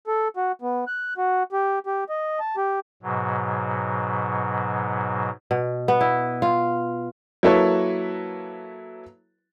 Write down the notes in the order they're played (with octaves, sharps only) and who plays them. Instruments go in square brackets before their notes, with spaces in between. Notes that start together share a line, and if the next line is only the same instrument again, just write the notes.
[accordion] A4
F#4
B3
F#6
F#4
G4
G4
D#5
A5
G4
[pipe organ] G#2 B2 F#3
[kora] B2
B3
E4
F4
[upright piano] F#3 A#3 E4 A4 B4 C#5